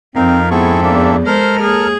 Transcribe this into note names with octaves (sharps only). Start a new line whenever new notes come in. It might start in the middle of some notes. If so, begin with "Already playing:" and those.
F2 C4 D#4 A#4 F5
G#2 B3 C4 E4 G#4 A4 C#6
E2 A#3 D4 E5
G#3 A4 A#4 C5 F6
D#2 G#4